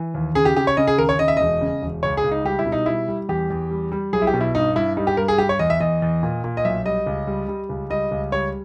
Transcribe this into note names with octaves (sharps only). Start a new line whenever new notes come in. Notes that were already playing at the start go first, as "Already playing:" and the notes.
Already playing: E3
D#2
C#3 G#4
G4
C#3 G4
C#5
C#3 D#5
G#4
D#2 A#4
C#5
C#3 D#5
E5
E1 D#5
C#3
E1
C#2 C#5
G#4
C#2
D#4
G3 G4
E4
B2
D#4
G3 E4
G3
E2 G4
E2
G3
G3
B1 G#4
E4
G4
B2
E4
G2 D#4
G2 E4
G3 D#4
G4
G2 A#4
G#4
G3 G4
C#5
E2 D#5
E5
E2 D#5
E2
A#2
A#2
D#5
B1 E5
G3 D#5
C#2
G3
G3
C#2
G3 D#5
C#2
G3 C#5